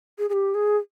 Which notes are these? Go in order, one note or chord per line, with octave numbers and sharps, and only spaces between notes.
G#4
G#4
G4
G#4